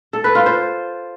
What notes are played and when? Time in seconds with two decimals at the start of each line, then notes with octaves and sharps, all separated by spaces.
0.13 A4
0.24 B4
0.35 F4
0.46 C5